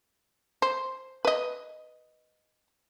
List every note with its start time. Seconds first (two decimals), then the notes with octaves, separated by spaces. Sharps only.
0.62 C5
1.25 B4 D#5